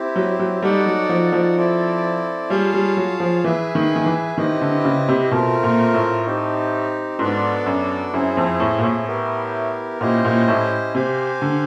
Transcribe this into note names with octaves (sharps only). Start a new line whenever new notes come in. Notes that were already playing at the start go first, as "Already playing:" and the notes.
Already playing: C4 E4 G4
F#3
F#3
G3 D#4 F#4 A4 D5 F#5
F#3
F3
F3
C4 E4 A4 D5
G3 F4 G#4 C#5 F5 A5
G3
F#3
F3
E3 G#4 B4 E5 G#5
D#3
D#3
E3
D#3 C4 E4 G4 B4 D#5
D3
C#3
C3
B2 A3 C4 F4 A#4
A#2
A2
C4 D#4 G4
G#2 B3 D4 F#4 A4 D5
F#2
F#2 C4 E4 G#4
F2
A2
A#2
A2
B3 E4 G4 A#4
A#2 C#4 E4 G4 C5 D#5
A#2
A2
C3 G4 C5 F5 G#5
D3